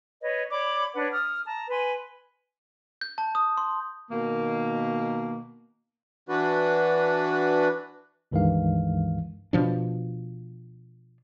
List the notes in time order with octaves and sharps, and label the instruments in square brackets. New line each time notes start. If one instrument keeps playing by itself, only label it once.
[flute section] B4 C#5 D#5
C#5 D5 B5 D6
D4 B4 C#5 F#5
D#6 F6
A5 A#5
B4 G#5 C6
[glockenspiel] G6
A5
D#6
C6
[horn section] B2 D#3 A#3
[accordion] E3 D4 F#4 B4
[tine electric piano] C#2 G2 D#3 E3 G#3 F5
[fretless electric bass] B2 F3 D4